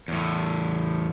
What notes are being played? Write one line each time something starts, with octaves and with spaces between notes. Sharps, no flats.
E2 A2